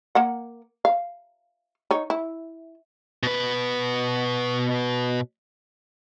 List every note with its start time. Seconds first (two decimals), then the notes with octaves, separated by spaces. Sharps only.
0.15 A#3 F#5
0.85 F5
1.91 D#4 C#5
2.10 E4
3.23 B2 B4